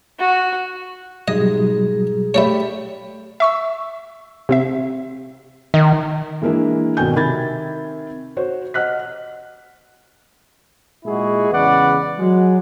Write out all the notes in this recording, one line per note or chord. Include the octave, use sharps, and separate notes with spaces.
F#4
G#2 B2 F#3 G3 G#4 D#5
A3 G4 C#5 D5 E5 B5
E5 C#6 E6
C3 C4 E5
D#3 D#5
E3 G#3 A#3 D4 E4
G#1 B2 F#4 G5 G#5 G6
C3 D#3 B5 G#6 A6
F#4 C5 C#5
D#5 F#5 F6 F#6 B6
A#2 G#3 E4 F#4 G#4
E2 C#3 B4 D5 F#5
F#3 G#3